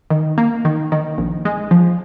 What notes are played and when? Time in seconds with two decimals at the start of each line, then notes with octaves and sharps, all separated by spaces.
0.10 D#3
0.38 A#3
0.65 D#3
0.92 D#3
1.18 A#1
1.45 G#3
1.71 F3